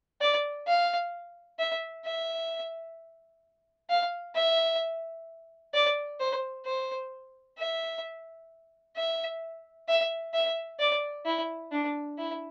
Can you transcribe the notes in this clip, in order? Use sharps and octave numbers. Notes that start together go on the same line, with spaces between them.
D5
F5
E5
E5
F5
E5
D5
C5
C5
E5
E5
E5
E5
D5
E4
D4
E4